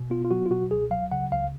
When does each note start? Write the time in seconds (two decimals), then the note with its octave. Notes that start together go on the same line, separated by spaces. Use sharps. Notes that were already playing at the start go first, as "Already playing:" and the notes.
Already playing: B2
0.10 B3 F4
0.25 F4
0.31 F#3 F#4
0.46 F4
0.50 B2 F#4
0.71 C#2 G#4
0.91 F#3 F5
1.11 C#3 F#5
1.32 C#2 F5